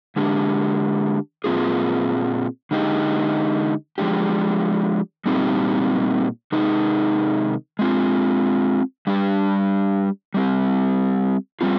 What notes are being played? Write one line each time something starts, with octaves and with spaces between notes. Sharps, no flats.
D3 G#3 D4 G4
A#2 F3 C4 F4 G#4
D3 G#3 D#4 G4
F3 G#3 D4 G4
A#2 G3 C4 D#4 G4
C3 D#3 G#3 D#4
G#3 C4 F4
G3 D4 G4
G3 C4 G4
G3 C4 F4